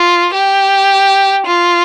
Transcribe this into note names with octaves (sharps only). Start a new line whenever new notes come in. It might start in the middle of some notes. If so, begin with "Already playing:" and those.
Already playing: F4
G4
F4